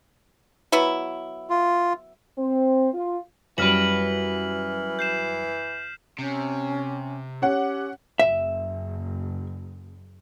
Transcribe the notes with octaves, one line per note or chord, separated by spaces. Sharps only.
F#3 B3 E4
F4
C4
F4
F#2 E3 G3 F#4 B4 F6 B6 F#7
G6 C7 E7
C3 C#4
C#4 G4 F#5
F#1 E5